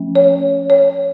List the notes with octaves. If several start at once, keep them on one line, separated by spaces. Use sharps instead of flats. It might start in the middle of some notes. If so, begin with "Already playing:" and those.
Already playing: F3 A3 C#4
C#5
C#5